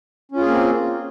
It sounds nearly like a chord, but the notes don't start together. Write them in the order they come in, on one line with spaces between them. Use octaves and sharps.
C#4 F4 G#4 A#3 C4